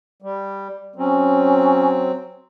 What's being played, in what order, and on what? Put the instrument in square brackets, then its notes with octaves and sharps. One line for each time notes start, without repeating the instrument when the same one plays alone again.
[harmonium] G3
[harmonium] F#3 C4 [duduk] C#4